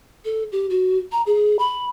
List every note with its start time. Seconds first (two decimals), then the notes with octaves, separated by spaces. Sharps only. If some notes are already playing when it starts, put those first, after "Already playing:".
0.25 A4
0.52 G4
0.70 F#4
1.12 A#5
1.27 G#4
1.59 B5